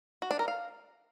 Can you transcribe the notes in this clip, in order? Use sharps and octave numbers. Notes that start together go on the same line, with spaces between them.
F#4
D4
A#4
F5